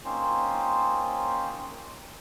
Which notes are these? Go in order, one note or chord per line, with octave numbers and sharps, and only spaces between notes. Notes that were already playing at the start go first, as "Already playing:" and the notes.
A#3 C4 C#4 D#4 F4 C5